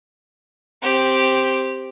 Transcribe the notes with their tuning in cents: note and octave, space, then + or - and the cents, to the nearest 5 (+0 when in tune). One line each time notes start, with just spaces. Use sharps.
C4 +0 G4 +0